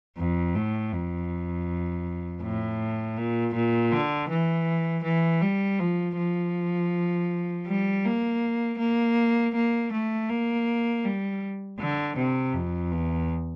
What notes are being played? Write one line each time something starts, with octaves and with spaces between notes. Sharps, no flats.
F2
A2
F2
A2
A#2
A#2
D3
E3
E3
G3
F3
F3
G3
A#3
A#3
A#3
A3
A#3
G3
D3
C3
F2
E2